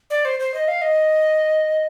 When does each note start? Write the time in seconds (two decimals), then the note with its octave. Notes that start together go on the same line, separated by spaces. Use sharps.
0.10 D5
0.25 C5
0.40 C5
0.54 D#5
0.68 F5
0.82 D#5